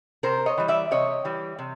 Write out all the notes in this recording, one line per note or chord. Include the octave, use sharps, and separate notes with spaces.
C3 A#4 C5
C#5 D#5
E3 G3
D5 E5
C3 C#5 D#5
E3 G3
C3